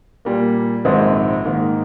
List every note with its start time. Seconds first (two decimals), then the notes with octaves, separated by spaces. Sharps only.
0.25 A#2 G3 A#3
0.85 A#1 G#2 D#3 G#3 C4
1.45 G#2 D#3 A#3